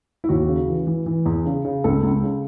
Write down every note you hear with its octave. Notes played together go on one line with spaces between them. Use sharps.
E4
D#2 F#4
C#3
E3
E3
E3
E2
C#3
C#3
C#2 A4
C#2
C#3